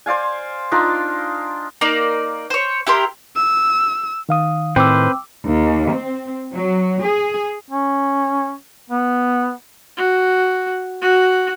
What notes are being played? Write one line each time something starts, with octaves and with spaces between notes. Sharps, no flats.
C5 D5 F5 G#5
D4 D#4 F4 A#4
A#3 D#4 D5
C5 C#5
E4 G4 A#4 C6
E6
D#3 F5 D#6
A2 D#3 C4 B4 C5 G5 D6 E6
D#2
C4
F#3
G#4
C#4
B3
F#4
F#4